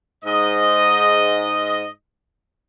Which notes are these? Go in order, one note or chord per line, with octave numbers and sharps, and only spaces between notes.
G#2 D#5